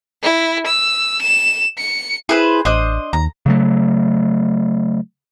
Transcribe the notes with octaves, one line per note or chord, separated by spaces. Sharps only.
E4
E6
E7
C#7
E4 G#4 B4 C5
A1 D4 C5 D#5
D#2 A#5
C#3 F#3 A3